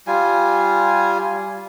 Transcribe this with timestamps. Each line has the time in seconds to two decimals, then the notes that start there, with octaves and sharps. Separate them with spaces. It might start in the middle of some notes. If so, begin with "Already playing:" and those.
0.07 G3 F4 G#5